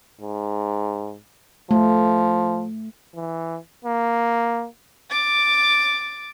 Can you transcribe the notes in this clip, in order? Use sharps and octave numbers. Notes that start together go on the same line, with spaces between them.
G#2
F3 A3
E3
A#3
D6 A6